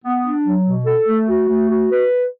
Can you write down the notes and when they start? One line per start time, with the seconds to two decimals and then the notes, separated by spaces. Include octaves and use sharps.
0.05 B3
0.25 D4
0.46 F#3
0.66 B2
0.86 A4
1.07 A3
1.29 F#4
1.49 A3
1.69 F#4
1.91 B4